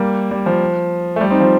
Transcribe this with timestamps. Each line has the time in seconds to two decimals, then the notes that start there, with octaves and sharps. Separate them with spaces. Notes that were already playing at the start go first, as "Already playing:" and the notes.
Already playing: G3 A#3
0.31 G3
0.46 F3
1.16 A3
1.21 G3
1.30 C4 D#4
1.40 F3